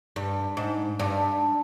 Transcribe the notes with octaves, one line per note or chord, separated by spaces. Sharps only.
G2
G#2
G2